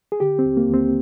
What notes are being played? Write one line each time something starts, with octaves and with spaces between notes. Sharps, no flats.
G#4
D3 G4
C4
D#2
A#3
D#2
C4